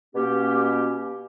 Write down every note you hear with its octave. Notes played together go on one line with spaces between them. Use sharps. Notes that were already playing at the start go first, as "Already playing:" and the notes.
B2 A#3 C#4 G4